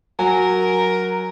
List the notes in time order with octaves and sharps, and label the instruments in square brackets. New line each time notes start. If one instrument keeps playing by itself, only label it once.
[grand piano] F#3 G#5 [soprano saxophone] A#4